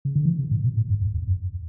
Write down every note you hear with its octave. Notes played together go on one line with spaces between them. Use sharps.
C#3
D3
E3
C#3
A2
B2
A2
G2
F#2
E2
F#2